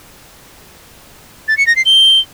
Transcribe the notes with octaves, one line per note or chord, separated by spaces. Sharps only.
A6
C#7
A#6
C7
G7